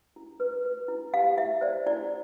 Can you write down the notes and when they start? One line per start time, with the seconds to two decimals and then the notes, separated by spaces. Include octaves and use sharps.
0.16 E4
0.40 B4
0.65 B4
0.88 E4
1.13 G4 F5
1.37 E4 E5
1.61 C5 D5
1.86 E4 D5